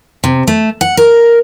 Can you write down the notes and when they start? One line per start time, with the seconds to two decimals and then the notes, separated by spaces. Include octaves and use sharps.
0.24 C3
0.47 A3
0.81 F#5
0.97 A#4